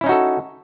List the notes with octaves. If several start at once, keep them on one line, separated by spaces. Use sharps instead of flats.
C#4 D#4 E4 F#4 A4